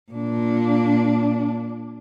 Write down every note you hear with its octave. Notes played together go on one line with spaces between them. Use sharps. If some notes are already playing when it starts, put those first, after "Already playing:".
A#2 D4